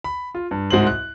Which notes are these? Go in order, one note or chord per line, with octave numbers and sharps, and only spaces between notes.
B5
F4
G2
C2 G#2 F#4 C5 C6 F#7
F#6